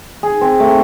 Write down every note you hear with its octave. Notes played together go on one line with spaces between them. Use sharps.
G#4
C4
A3